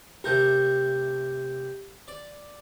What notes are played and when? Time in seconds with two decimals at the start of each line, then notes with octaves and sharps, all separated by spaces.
0.24 C3 A3 G4 A#4 G6
2.08 D5